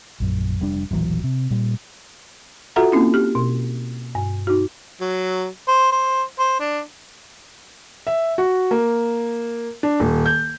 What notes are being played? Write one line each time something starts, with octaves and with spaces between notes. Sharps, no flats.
A#1 F#2
F1 G3 D4
D#1 A1 E3 F#3
C3
A#2 G3
F4 F#4 A4 E5 F#5 A#5
A#3 C4 C#4 E4
G4 F6
B2
G2
D#4 F#4
F#3
C5
C5
C5
D4
E5
F#4
A#3
D4
D#1
G6